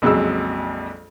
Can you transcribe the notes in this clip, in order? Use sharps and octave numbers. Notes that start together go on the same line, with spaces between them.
A#1 F2 C#3 F#3 G#3 E6